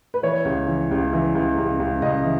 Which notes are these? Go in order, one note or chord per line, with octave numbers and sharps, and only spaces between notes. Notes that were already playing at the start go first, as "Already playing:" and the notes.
B4
E3 C#5
C#2
E3
C#2
E3
C#2
C#2
C#2
C#2 D#5
E3